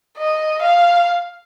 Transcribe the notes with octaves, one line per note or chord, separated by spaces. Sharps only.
D#5
F5